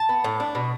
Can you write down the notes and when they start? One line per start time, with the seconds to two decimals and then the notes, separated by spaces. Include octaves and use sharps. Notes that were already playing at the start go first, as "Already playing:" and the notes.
Already playing: A5
0.09 B3
0.24 A2
0.40 D4
0.55 B2